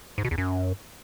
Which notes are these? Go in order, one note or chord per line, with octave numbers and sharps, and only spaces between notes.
G#2
B2
E2
F#2